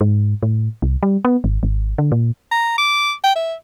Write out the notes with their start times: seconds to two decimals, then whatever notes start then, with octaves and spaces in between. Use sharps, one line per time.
0.01 G#2
0.43 A2
0.82 C2
1.03 G3
1.25 B3
1.44 G#1
1.63 G#1
1.98 D3
2.12 A#2
2.52 A#5
2.78 D6
3.24 G5
3.36 E5